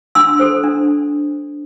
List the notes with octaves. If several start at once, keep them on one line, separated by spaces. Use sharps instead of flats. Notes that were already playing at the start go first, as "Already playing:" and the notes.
D4 C6 E6
A4 C5
D4